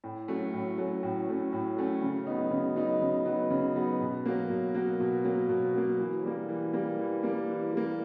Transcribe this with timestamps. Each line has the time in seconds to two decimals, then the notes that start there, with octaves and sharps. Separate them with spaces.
0.04 A2
0.28 F#3 A3 C#4
0.53 A2
0.78 F#3 A3 C#4
1.03 A2
1.28 F#3 A3 C#4
1.52 A2
1.77 F#3 A3 C#4
2.02 C#3
2.27 F#3 B3 D#4
2.51 C#3
2.76 F#3 B3 D#4
3.02 C#3
3.26 F#3 B3 D#4
3.50 C#3
3.76 F#3 B3 D#4
4.01 B2
4.26 F#3 A#3
4.50 B2
4.75 F#3 A#3
5.00 B2
5.24 F#3 A#3
5.49 B2
5.74 F#3 A#3
5.99 E3
6.24 G3 A#3
6.49 E3
6.73 G3 A#3
6.98 E3
7.23 G3 A#3
7.48 E3
7.73 G3 A#3